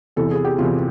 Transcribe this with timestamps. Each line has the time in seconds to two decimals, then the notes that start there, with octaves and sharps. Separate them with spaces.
0.16 E2 C3 E3 A4
0.31 G#4
0.45 G4
0.58 E2 C3 E3 F4